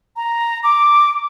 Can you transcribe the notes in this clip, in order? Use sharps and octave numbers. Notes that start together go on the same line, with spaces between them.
A#5
D6